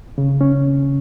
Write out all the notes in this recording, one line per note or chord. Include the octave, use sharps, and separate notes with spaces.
C#3
C#4